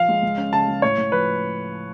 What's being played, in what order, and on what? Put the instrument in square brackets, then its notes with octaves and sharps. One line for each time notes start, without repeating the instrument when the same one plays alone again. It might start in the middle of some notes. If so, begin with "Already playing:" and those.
Already playing: [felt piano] F3 [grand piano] F5
[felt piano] G#3
C#2
C#4
[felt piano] C#3 [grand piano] A5
[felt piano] G#3
[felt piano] A2 [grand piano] C#5
[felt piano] A2
[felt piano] F3 [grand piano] B4